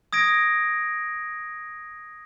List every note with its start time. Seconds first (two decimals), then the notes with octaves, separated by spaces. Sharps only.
0.13 D#6 G#6 A#6 D7